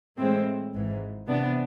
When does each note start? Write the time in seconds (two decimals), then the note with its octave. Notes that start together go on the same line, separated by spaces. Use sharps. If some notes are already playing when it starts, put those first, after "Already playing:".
0.18 A2 E3 G#3 C4
0.73 G#1 G#2 E3
1.27 C3 E3 B3 D4